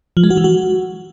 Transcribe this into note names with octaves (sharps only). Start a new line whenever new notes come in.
F3
G#3
F#4
E3
F#4